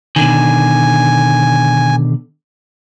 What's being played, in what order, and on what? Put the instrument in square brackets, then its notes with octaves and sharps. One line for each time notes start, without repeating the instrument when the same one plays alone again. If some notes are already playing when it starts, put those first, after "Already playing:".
[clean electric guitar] B2 D3 D#3 [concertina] G#5